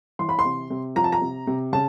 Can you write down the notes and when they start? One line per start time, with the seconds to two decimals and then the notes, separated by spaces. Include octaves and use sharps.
0.19 E3 C6
0.29 B5
0.39 C6
0.45 C3
0.70 C3
0.96 F3 A#5
1.04 A5
1.12 A#5
1.21 C3
1.47 C3
1.72 C#3 A5